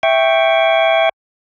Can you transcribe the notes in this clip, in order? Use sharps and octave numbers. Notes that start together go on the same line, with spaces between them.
E5 G5 C#6